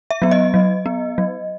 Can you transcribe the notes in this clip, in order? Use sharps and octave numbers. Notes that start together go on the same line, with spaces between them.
E5
F#3 B3
D#5
F#3
B3
F#3